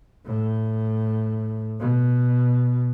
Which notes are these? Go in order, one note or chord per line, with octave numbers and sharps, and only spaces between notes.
A2
B2